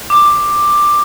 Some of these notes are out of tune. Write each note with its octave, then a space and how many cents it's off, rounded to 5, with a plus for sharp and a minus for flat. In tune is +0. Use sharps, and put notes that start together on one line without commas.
D6 +10